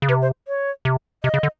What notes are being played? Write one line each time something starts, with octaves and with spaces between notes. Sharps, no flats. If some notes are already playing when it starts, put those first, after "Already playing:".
C#3
C3 B4
C5
C#5
C3
C3 D#5
C#3
D3